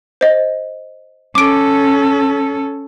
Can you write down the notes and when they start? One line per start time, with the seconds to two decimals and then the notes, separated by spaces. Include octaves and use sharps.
0.21 C5 D#5
1.35 C#4 A4 D6 D7